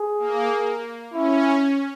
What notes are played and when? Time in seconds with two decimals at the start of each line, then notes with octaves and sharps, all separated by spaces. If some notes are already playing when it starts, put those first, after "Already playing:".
Already playing: G#4
0.19 A#3
1.13 C#4 E4